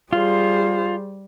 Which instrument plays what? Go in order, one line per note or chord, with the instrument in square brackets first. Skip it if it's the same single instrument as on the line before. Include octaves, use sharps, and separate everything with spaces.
[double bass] G3 [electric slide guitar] F4 [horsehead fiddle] G#4 C5